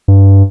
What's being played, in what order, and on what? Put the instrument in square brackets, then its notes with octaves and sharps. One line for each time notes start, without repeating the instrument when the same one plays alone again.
[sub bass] G2